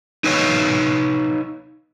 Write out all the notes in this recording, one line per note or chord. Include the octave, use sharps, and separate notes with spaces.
D#4 B4 C#5 F5